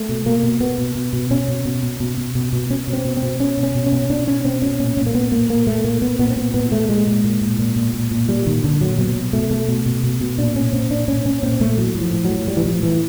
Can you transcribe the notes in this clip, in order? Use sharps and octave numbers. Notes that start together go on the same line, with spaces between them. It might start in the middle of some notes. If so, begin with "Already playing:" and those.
Already playing: A3
B2
B2 A#3
B2
B2 B3
B2
B2
B2
B2 C#4
B2
B2
B2
B2
B2
B2
B2
B2 C#4
B2
C4
B2
C4
B2
B2 C#4
B2
C#4
B2
C#4
B2
B2 D4
B2 C#4
B2 C4
B2 C#4
A#2 C#4
A#2 C#4
A#3
A#2 B3
A#2 A#3
A#2 A#3
A#2 A3
A#2 A#3
A#2 B3
A#2 B3
C4
A#2 B3
A#2 B3
A#2 A3
A#2 G#3
A#2
A#2
A#2
A#2
A#2
A#2
A#2
A#2 G3
A#2 D#3
A#2 D3
A#2 F#3
B2 F#3
B2
B2 A3
B2 A3
B2
B2
B2
B2
A#2 D4
A#2 C#4
A#2 C4
A#2 D4
A#2 C#4
A#2 C#4
A#2 C4
A#2 A3
A2 F#3
A2
F3
A2
F#3
A2
A2 G3
E3
A2 F3
A2 E3